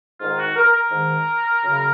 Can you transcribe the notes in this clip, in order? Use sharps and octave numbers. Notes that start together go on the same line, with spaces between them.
G#2 D#3 F4
F#4
A#4
A#4
G#2 D#3
F#2 C#3